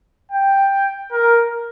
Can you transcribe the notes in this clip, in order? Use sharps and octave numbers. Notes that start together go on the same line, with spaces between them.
G5
A#4